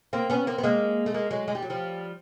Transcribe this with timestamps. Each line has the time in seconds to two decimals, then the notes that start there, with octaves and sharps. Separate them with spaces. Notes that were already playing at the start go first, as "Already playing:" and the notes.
0.13 A#3 C4
0.30 B3 C#4
0.47 A#3 C4
0.58 B3
0.63 G#3 A#3
1.06 A3
1.14 G#3 A#3
1.31 F#3 G#3
1.48 G#3
1.55 G3
1.62 F#3
1.70 F3 G3